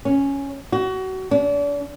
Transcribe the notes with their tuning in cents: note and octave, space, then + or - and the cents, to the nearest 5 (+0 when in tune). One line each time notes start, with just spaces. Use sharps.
C#4 +0
F#4 +25
D4 -35